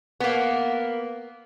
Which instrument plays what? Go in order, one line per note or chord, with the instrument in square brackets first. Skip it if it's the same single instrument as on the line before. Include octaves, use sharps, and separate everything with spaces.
[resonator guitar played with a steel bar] A#3 B3